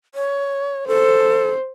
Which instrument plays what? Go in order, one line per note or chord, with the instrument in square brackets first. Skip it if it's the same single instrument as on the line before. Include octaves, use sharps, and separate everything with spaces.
[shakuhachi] C#5
[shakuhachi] A4 [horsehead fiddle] C5